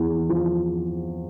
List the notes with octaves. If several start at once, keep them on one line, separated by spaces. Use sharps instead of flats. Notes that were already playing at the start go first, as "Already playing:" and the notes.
Already playing: E2
F3